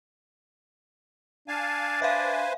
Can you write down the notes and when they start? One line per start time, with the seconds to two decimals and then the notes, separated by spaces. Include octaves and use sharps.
1.48 D4 F5 G#5 A5
2.02 B4 C5 E5 F5 G#5